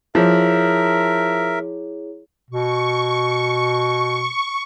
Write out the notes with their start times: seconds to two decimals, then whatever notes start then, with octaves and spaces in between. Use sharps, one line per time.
0.15 F3 E4 G#4 A#4 C#5 E5
2.51 B2 C#6